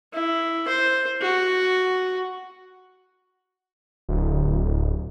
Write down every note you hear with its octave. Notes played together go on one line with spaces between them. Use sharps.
E4
C5
F#4
D1